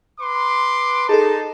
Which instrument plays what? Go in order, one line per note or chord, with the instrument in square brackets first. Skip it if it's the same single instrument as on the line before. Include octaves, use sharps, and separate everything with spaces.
[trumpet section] B4 C6 D6
[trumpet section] D#4 A5 [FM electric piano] G#4 A4